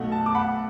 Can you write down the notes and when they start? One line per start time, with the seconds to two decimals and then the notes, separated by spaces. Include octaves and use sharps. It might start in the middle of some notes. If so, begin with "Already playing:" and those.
Already playing: B1 B2 A3 F#5
0.12 A5
0.26 D6
0.35 F#5 B5